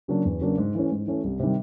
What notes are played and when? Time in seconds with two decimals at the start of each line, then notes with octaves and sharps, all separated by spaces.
0.08 C#3 F#3 A#3 D4
0.25 E2
0.41 C#3 F#3 A#3 D4
0.58 G#2
0.75 E3 A3 C#4
0.91 G#2
1.07 E3 A3 C#4
1.24 C2
1.40 C3 D#3 G3